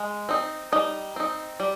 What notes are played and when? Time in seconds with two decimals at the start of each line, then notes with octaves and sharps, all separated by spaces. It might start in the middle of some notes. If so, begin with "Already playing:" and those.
Already playing: G#3
0.29 C4 D#4
0.72 G3 D#4
1.16 C4 D#4
1.60 G3